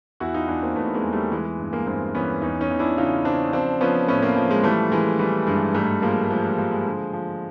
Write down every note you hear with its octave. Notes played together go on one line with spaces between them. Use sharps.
E2 E4 F#4
D#4 F4
E2 D4 E4
A#3 C4
E2 A3 B3
G#3 A#3
E2
G3 A3
E3 G#3
G#3
G2
G#3 A#3
G2 A#3 C4
E3 B3 C#4
E2 C#4 D#4
C#4 D#4
E2
D4 E4
C#3 D#4 F4
C#3 C4 D4
F3 C4 D4
F3 B3 C#4
A2 B3 C#4
A#3 C4
F3
G#3
E3 G3 A3
E3 G#3
E3 G3
G2 G#3
G#2 G3 A3
F3 G#3 A#3
A3
F3 G#3
G3
F3 G3
G#3
D3
F3